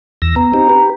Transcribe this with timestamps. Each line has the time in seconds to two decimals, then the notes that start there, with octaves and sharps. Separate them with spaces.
0.22 E2 E6 A#6
0.36 B3 A#5
0.54 C4 D#4 G4
0.69 G4 B4